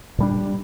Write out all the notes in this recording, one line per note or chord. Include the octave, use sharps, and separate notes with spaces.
A#2 G3 D4